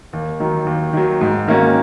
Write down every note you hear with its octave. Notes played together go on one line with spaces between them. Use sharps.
D#2
D#3 F#3
D#2
D#3 F#3
G#2
D#3 A#3 C#4 F#4